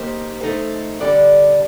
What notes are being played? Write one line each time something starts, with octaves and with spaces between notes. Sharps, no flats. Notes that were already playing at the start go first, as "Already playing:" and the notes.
Already playing: A#3 D#4 G4 C5
A3 D#4 A4 C5
D3 G3 D4 A4 D5